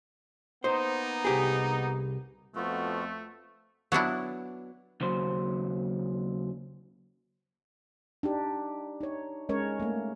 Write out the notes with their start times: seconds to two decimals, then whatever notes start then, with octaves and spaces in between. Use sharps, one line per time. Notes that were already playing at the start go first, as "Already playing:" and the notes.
0.64 A#3 B3 D#4 C5
1.25 C2 G4 G#4
2.55 F2 A3 B3 F4 F#4
3.92 F#3 B3 D4 E4
5.01 D#2 C#3 F#3 C5
8.23 D4 D#4 G4
9.01 D#4 C#5
9.49 G#3 C#4 A#4 C#5
9.80 A3 A#3